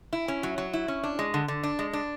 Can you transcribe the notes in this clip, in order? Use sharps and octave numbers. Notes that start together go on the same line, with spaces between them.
E4
C#4
F#3
F#3
E4
C#4
D4
G#3
D3
D3
D4
G#3
D4